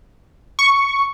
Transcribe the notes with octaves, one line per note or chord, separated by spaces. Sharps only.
C#6